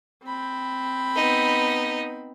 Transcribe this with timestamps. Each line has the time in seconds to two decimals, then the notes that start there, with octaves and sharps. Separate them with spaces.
0.24 C4 B5
1.16 B3 D#4